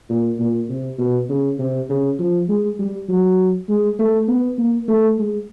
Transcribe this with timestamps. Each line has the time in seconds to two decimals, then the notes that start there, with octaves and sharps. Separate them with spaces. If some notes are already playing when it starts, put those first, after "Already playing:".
0.09 A#2
0.39 A#2
0.69 C3
0.98 B2
1.29 C#3
1.59 C3
1.89 C#3
2.19 F3
2.49 G#3
2.79 G3
3.08 F#3
3.68 G#3
3.99 A3
4.28 B3
4.58 A#3
4.88 A3
5.18 G#3